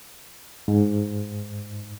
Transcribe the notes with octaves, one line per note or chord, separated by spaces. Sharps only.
G#2